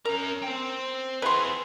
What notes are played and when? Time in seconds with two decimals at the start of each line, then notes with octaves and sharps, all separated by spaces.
0.05 C#4 A#4 A#5
0.42 C5 G5
1.22 E4 G#4 B4 C6